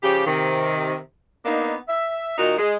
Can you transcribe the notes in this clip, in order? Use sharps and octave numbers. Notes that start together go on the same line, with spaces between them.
C#3 F3 G4
C3 D#3
A#3 B3 D4 D#4
E5
A#2 D#3 D#4 F#4
G#3